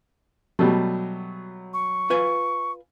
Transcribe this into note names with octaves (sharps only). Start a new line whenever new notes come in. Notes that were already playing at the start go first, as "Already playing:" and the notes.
B2 F#3 G3 A3
C#6
F4 B4 G#5